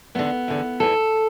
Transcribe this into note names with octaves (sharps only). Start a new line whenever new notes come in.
E2 D3 B3
E2 D3
E2 E3 A4